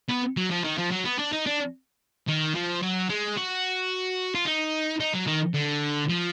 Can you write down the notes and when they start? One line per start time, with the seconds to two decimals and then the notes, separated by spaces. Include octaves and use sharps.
0.09 B3
0.37 F#3
0.50 F3
0.64 D#3
0.78 F3
0.91 F#3
1.05 B3
1.19 D4
1.32 D#4
1.46 D4
2.28 D#3
2.55 F3
2.82 F#3
3.09 G#3
3.37 F#4
4.35 F4
4.46 D#4
5.00 D#4
5.14 F#3
5.27 D#3
5.55 D3
6.09 F3